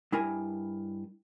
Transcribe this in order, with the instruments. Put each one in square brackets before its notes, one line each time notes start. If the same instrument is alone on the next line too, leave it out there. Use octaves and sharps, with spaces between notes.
[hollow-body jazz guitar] G2 E4 A#4 G#5